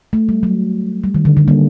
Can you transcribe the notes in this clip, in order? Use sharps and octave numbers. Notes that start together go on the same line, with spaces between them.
A3
G3
F#3
G3
D#3
D3
D3
G3 A#3